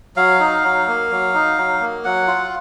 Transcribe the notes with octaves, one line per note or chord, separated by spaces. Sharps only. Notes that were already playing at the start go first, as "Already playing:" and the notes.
F#3 F5
D#4
F#3
A#3
F#3
D#4
F#3
A#3
F#3 F#5
F4